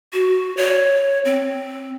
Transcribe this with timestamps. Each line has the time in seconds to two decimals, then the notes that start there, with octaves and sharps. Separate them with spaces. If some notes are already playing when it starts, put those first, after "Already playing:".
0.13 F#4
0.57 C#5
1.25 C4